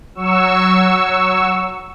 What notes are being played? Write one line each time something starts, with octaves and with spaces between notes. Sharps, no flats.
F#3 C#6 E6